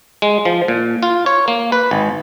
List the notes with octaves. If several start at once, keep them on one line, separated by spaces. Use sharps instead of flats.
G#3
F3
A#2
F4
C#5
A#3
B4
G#1